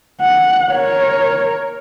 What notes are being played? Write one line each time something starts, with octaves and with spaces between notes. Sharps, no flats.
F#5
A#4 C#5